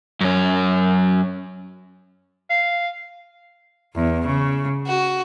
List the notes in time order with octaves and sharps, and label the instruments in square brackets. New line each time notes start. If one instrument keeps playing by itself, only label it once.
[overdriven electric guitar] F#2 C#4
[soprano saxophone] F5
[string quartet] E2
C#3
F#4